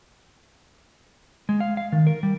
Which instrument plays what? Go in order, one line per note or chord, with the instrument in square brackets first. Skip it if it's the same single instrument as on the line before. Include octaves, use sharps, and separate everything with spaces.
[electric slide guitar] G#3
F5
F5
D#3
A#4
G3